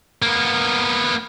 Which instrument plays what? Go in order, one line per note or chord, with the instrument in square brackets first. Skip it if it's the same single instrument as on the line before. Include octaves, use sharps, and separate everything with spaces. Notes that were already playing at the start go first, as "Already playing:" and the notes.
[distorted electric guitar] A#3 B3